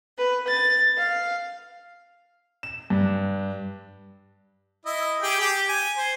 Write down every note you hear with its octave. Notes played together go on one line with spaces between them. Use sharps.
B4
A6
F5
E7
G2
E4 D#5
G4 G#4 G5
G4
G#5
C5